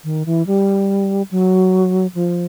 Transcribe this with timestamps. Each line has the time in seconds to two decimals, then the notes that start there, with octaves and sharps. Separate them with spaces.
0.04 D#3
0.26 E3
0.47 G3
1.31 F#3
2.15 F3